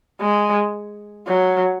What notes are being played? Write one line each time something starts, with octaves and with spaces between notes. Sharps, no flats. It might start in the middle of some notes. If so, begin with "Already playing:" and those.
G#3
F#3